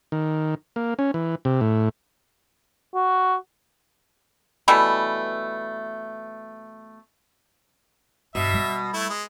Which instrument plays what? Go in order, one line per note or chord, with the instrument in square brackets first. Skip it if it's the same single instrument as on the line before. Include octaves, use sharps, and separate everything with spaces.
[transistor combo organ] D#3
A#3
C#4
E3
C3
A2
[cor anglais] F#4
[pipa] B2 E3 G3 A3
[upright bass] G2 [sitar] B2 [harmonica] E5
[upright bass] G3
[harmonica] A3 E4
G#3